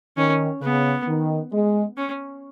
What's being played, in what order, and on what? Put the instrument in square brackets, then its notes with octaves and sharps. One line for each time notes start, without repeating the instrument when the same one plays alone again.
[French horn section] D#3 [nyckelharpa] C#4
[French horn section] C#3 [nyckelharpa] B3
[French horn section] D#3
G#3
[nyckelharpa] C#4